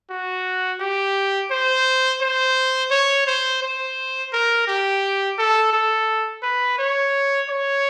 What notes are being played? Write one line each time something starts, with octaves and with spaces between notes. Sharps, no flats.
F#4
G4
C5
C5
C#5
C5
C5
A#4
G4
A4
A4
B4
C#5
C#5